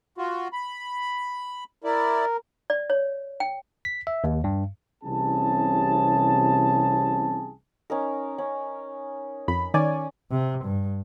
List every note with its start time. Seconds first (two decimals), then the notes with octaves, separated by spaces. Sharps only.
0.18 F4 F#4
0.53 B5
1.84 E4 A#4 D5
2.70 D5
2.90 C#5
3.40 G5
3.85 B6
4.07 E5
4.24 D#2
4.44 G2
5.04 C2 C3 E3 C#4 G#4 A5
7.90 C#4 D#4 A#4
8.38 C#4
9.48 F2 B5
9.74 D#3 C#4 D5 G#5
10.31 C3
10.64 G2